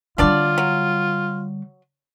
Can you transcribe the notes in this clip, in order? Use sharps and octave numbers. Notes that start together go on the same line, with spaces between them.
D3 F#3 G3 D4 F4 D5
F#3